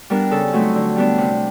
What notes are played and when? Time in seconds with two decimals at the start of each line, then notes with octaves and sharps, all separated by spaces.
0.10 G3 B3 D4 A#4
0.31 C#3 A4
0.53 F#3 A3 C4 D#4
0.75 D3
0.96 G3 B3 D4
1.18 C3